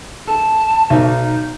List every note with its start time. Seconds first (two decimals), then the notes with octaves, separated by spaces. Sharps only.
0.27 A4 A5
0.90 B1 D#4